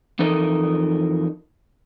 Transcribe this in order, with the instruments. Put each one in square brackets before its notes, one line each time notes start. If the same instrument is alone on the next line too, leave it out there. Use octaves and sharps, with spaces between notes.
[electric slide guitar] F2 E3 D#4 A4 A#4 D#5